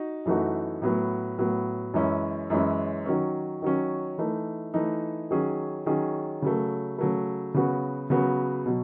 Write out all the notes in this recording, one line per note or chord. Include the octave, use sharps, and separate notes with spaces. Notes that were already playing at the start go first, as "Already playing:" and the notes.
Already playing: D#4 F#4
F#2 E3 A3 D#4 F#4
A2 F#3 B3
A2 F#3 B3
F#2 E3 G#3 C#4 E4
F#2 E3 G#3 C#4 E4
D#3 F#3 C#4
D#3 F#3 C#4
E3 A3 D#4
E3 A3 D#4
D#3 F#3 C#4 G#4
D#3 F#3 C#4 G#4
C#3 F#3 A3
C#3 F#3 A3
C#3 F#3 B3 F#4
C#3 F#3 B3 F#4
B2 F#3